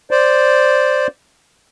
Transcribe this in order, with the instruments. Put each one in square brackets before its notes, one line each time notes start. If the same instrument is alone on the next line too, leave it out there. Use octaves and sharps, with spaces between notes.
[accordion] C5 D5